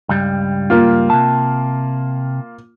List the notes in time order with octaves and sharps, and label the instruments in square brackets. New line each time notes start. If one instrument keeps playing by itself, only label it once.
[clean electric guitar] C#2 G2 G3
[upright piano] A#3 F4
[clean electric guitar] C3 A5